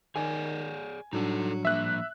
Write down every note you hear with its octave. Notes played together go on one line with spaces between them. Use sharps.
D#3 G#4 C#5 D5 G#5
A2 F#3 G3 D4 D#4 A4
F3 A#3 E5 F#6